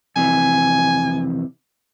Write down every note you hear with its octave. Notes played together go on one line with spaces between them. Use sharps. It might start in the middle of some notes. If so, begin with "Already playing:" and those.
F2 C3 E3 G#5